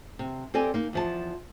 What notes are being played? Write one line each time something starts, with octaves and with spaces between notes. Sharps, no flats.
C3
C4 G4 A4 D5 D#5 G#5
A#3 D#4
E2 F3 A5